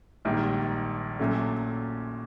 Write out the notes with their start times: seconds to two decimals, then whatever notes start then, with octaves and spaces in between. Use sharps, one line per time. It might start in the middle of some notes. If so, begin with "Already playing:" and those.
0.25 A#1 G#2 D#3 G3 A#3
1.19 A#2 F#3 A3 C#4